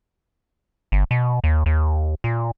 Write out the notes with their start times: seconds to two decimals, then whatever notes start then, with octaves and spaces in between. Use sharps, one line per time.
0.92 G1
1.11 B2
1.44 D#2
1.66 D#2
2.24 A#2